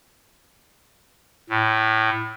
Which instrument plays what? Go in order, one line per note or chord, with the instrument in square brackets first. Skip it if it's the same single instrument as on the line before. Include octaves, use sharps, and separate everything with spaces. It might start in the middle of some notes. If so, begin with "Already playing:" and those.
[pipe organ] A2